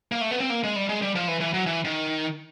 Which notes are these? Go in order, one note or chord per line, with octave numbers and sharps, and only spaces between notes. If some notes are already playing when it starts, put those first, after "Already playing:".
A#3
A3
B3
C4
A#3
G#3
G3
G#3
G3
F3
E3
E3
F#3
E3
D#3